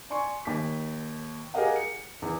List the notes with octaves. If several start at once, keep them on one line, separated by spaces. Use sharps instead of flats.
D5 G#5 C6 C#6
D#2 B6
G4 G#4 A#4 D#5 F5 F#5
C#7
E2